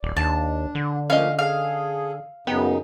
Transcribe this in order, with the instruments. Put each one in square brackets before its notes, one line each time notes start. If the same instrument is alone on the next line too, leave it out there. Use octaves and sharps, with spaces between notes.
[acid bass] D#1 [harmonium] D5
[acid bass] D#2 [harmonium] D4 [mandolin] A5
[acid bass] D3
[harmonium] F3 A3 A#3 [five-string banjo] C#4 D#5 [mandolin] F5
[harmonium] G#4 A4 [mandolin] F5
[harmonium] F#2 C#3 D#4 [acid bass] B3 [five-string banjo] G4